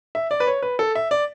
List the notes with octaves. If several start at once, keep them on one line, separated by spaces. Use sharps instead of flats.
E5
D5
B4
C#5
B4
A4
E5
D5